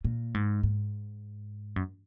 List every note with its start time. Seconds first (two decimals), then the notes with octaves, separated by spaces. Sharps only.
0.05 A#2
0.34 G#2
0.63 G#2
1.76 F#2